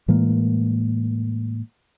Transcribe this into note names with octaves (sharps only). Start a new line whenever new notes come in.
A2 E3 G#3 A#3